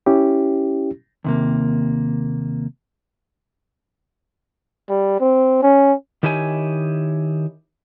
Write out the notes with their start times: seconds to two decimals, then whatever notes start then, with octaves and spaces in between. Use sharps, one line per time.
0.06 C#4 E4 G4
1.24 D#2 C3 A#3
4.89 G3
5.20 C4
5.62 C#4
6.23 D#3 D#4 E4 G4 C#5 G#5